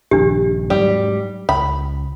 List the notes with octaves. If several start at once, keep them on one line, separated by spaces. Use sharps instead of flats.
A#1 D#2 D4 G4
G#2 F#3 G3
C#2 B5